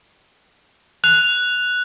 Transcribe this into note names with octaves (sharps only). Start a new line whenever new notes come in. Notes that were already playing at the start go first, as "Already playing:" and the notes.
F#6 F7